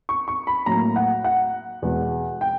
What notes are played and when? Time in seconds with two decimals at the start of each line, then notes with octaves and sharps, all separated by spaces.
0.09 C#6
0.28 C#6
0.47 B5
0.66 A2 F#3 A#3 A#5
0.96 F#5
1.24 F#5
1.82 E2 B2 G#3
2.41 G5